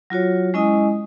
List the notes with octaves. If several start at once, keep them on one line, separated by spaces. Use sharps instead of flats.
F#3 F4 F#4 C#5
G#3 C#4 E4 D#5 G#5 D#6